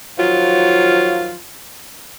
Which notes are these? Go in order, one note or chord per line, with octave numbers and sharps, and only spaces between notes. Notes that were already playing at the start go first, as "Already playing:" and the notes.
D#3 F3 F#3 F4